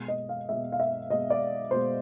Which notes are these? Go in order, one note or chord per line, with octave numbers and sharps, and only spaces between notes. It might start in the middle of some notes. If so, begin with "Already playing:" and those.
Already playing: B2 G#3
D#5
F5
B2 G#3 E5
F5
E5
B2 G#3 D#5
D5
B2 G#3 C5